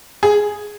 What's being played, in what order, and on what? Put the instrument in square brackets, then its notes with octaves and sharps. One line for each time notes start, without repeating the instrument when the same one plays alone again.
[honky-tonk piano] G#4